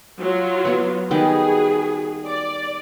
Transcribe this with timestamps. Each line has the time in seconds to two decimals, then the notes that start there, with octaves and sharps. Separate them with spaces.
0.22 F#3 F4
0.65 B3 B4
1.11 D#3 G3 B3 F#4 G#4
2.27 D5